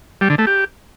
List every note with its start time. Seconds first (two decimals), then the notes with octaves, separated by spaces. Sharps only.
0.21 G3
0.30 D3
0.38 A3
0.47 G4